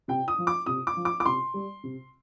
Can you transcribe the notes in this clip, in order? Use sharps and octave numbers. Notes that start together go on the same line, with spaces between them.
C3 G5
D#6
F3
D6
C3 D#6
D6
F3
D6
D6
C3 C6
G3
C3